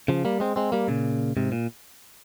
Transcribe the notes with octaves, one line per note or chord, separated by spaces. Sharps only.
C#3 F3
G3 A#3
G#3 C4
G#3 C4
G3 A#3
A#2 C#3
G#2 C3
A#2